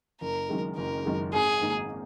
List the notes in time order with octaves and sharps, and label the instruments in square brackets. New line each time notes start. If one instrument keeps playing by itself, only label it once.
[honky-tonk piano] F#1 [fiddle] A#4
[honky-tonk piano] F#2 D#3 G#3
[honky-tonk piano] F#1 [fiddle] A#4
[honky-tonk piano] F#2 D#3 G#3
[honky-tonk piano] G#1 [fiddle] G#4
[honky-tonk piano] G#2 D#3 A#3 D#4